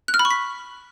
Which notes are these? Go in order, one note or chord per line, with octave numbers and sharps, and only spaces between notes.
F#6
F6
B5
C#6
B6